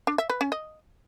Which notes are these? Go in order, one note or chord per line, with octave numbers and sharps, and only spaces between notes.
D4
E5
B4
C#4
D#5